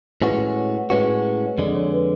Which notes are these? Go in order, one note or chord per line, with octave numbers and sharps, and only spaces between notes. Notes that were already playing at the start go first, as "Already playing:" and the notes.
A2 G#3 C#4 F#4 B4
C#5
A2 G#3 C#4 F#4 B4
F2 D3 G#3 D5
C#5
B4